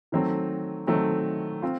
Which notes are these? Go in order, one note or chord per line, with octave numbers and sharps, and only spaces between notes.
D#3 F#3 A3 C4
D#3 F#3 A3 C4
C4 F4